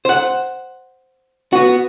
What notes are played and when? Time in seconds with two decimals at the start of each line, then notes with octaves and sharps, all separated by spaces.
0.05 C5 F#5
1.53 B3 F#4